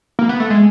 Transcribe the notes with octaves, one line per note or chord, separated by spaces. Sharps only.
A#3
B3
A3
G#3